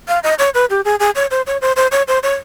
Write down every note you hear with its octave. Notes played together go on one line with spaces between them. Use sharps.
F5
D#5
C#5
B4
G4
G#4
G#4
C#5
C5
C#5
C5
C5
C#5
C5
C#5